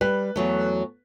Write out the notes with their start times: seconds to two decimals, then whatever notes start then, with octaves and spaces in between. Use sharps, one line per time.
0.01 G3 B4
0.36 E2 F#3 A3